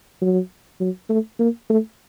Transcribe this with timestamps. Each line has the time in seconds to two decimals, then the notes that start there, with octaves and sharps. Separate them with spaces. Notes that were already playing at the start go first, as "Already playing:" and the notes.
0.21 F#3
0.80 F#3
1.09 A3
1.39 A#3
1.69 A3